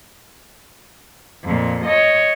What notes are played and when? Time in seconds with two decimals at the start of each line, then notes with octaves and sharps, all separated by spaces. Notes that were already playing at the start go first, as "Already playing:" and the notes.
1.42 F2 A#2
1.85 C#5 D#5